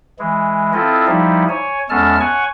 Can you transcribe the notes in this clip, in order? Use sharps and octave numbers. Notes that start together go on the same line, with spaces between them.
E3 G#3
C4 E4 F4 A4 D#5
F3 G3 D#4 E4
C#5 G#5
E2 G#3 C#4 A4 A5 F6
C#5 F#5 G#5 C#6